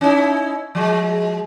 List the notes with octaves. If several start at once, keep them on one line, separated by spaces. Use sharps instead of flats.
C#4 D#4 E4
F3 G#3